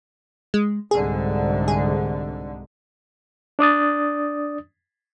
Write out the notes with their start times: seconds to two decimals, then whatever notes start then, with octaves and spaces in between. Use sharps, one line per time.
0.54 G#3
0.91 C2 G#2 D3 G#4
1.68 G#4
3.59 D4 D5 D#6 A6